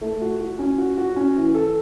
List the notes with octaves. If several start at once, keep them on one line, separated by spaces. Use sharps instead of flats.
A3
F#4
F#4
C#4
F#4
F#4
C#4
E3
A4